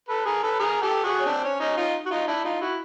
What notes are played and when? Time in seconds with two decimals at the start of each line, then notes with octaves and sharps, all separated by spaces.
0.09 A4 B4
0.26 G#4 A#4
0.43 A4 B4
0.59 G#4 A#4
0.82 G4 A4
1.04 F#4 G#4
1.20 C#4
1.26 C4 D4
1.44 C#4
1.60 C#4 D#4
1.77 D#4 F4
2.06 F#4
2.11 D#4 F4
2.28 D4 E4
2.44 D#4 F4
2.61 E4 F#4